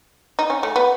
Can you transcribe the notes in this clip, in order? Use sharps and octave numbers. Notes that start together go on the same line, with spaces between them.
D#4
C#4
A3
B3